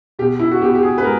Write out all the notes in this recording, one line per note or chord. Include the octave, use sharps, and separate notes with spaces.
B2 G4
E4
F#4
B3 G4
G4
G#4
B4
G#3 A#4